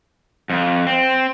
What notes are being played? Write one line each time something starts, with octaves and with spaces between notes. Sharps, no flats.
F2
C4